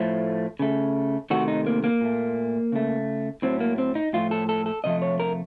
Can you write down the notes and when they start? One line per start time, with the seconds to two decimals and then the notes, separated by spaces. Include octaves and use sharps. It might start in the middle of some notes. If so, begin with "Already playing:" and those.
Already playing: A2 F3 A3
0.59 C#3 A3
1.30 C3 D#3 A3 F#4
1.48 D#4
1.66 A#3
1.84 A#3
2.01 A#2 A3
2.72 C#3 A3
3.42 A2 F#3 A3 C4
3.60 A#3
3.78 C4
3.95 D#4
4.13 A2 F3 A3 F4
4.31 A4
4.49 A4
4.66 A4
4.84 C3 F3 A3 D#5
5.02 C#5
5.20 A#4